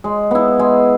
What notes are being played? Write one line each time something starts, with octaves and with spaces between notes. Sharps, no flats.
G#3
B3 E4
G#3